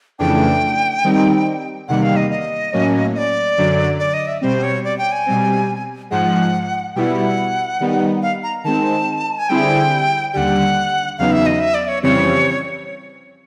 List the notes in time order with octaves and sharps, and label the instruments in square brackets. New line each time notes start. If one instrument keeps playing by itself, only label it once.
[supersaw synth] F2 C#3 E3 A3 D4 [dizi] G5
[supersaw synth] D#3 G3 C4 D#4
[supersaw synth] E2 C3 D#3 G3 A#3 [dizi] F#5
[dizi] F5
D#5
D#5
[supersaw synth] A2 F#3 A#3 C#4
[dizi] D#5
D5
[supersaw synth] F#2 D3 F#3
[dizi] D5
D#5
E5
[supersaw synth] B2 G3 C4 [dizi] C5
[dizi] C#5
D5
G5
G#5
[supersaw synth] B2 G3 C4
[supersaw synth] G#2 F3 G#3 [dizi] F#5
[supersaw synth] B2 G3 B3 E4 [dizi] F#5 G5
[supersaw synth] D#3 G3 B3 D#4
[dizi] F5
A#5
[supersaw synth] D#3 G#3 C4 [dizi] A5
[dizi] G#5
[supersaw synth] D3 G3 C4 E4 G#4 [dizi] G5
[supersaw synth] D#2 D3 G3 [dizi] F#5 G5
[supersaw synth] E2 C#3 F#3 B3 D#4 [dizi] F5
[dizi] E5
D#5
E5
D5
C#5
[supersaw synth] F2 C#3 E3 G3 C4 [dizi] C#5